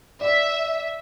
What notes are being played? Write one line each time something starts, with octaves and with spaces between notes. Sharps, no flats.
D5 E5